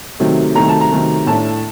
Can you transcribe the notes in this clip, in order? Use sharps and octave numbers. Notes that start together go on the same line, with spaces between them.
C3 D#3 F#3 A3
C3 D#3 F#3 A3 A#5
A5
A#5
C3 D#3 F#3 A3
A2 A3 D4 A5